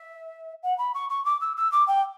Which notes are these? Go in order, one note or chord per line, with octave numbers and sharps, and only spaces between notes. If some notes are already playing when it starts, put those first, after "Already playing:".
Already playing: E5
F#5
B5
C#6
C#6
D6
E6
E6
D6
G5